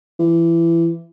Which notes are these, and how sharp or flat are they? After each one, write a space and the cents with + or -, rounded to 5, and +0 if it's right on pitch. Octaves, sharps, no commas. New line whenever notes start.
E3 +20